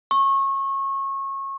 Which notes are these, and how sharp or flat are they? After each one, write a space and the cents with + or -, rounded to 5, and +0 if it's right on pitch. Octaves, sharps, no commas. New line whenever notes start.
C#6 -25